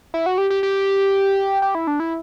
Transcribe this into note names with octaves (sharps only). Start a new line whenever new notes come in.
E4
F#4
G4
G4
G4
G4
E4
D4
E4